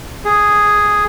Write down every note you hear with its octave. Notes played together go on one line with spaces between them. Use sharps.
G#4